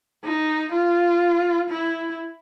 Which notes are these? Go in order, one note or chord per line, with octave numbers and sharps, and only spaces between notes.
D#4
F4
E4